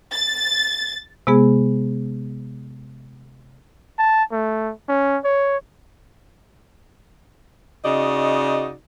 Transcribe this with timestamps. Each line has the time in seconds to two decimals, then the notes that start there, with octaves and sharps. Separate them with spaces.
0.12 A6
1.27 C3 G#3 B3 G#4
3.99 A5
4.32 A3
4.89 C#4
5.24 C#5
7.85 C#3 D#4 F#4 D5 D#5